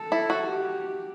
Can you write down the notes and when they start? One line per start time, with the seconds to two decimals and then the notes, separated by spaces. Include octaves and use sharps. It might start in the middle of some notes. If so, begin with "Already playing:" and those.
Already playing: A4
0.12 E4
0.30 F#4
0.47 G4